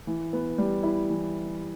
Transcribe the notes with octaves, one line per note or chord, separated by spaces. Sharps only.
E3
B3
G3
E4
E3